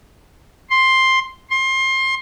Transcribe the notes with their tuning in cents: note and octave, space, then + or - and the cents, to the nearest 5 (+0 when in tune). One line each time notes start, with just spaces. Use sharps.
C6 +5
C6 +25